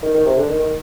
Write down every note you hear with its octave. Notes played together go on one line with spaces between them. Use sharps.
D#3
D#3
C3
D3
D#3
D#3